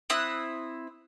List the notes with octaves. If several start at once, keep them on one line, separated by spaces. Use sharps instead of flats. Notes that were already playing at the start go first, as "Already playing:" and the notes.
C4 E4 D#6 F#6